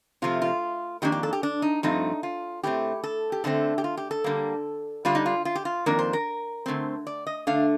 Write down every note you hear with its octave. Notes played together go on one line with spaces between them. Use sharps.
C3 F3 A3 F4
F4
F2 D#3 A#3 D4 G4
G4
A4
G4
D4
D#4
G2 F3 A3 C4 D#4
F4
A2 A3 C4 G4
A4
G4
D3 A3 C4 A4
G4
F4
G4
A4
D3 G3 A#3
D3 G3 D4 F4
D#4
F4
F4
G4
F4
F2 D#3 A#3 D4 A#4
C5
A#4
D3 A3 C4
D5
D#5
D3 A3 D4 F5